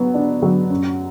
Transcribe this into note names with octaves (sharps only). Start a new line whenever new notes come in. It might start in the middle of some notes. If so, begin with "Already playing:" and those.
Already playing: F#3 B3
D4
F#3
F#2